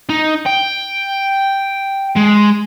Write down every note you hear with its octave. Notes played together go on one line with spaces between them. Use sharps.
D#4
G5
G#3